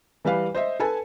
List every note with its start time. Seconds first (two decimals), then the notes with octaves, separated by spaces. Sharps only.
0.25 E3 G3 B4 F5
0.55 C5 D#5 E5
0.80 A4 B4 G#5 A5